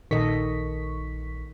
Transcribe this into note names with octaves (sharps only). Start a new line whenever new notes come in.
A#1 D#3 A4 D#5 C#6 B6